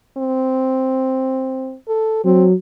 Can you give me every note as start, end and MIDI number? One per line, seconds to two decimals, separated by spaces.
0.18 1.76 60
1.89 2.21 69
2.25 2.54 54
2.25 2.46 60